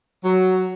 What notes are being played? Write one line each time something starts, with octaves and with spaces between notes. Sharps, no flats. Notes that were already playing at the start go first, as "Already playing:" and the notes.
F#3